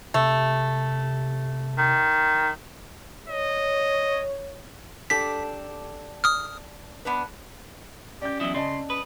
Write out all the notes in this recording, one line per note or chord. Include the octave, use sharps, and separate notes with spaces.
C3 A3
D#3
C#5 D#5
D4 G4 A4 B6
D#6 F6
B3 D4 B4
C#4 G4 D5 G6
E2 F#3 E4 D#5
C#3 D5 D#5 A5 C6
B4 D#6